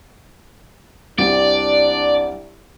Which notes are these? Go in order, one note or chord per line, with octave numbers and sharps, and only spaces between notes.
C2 C4 D4 D5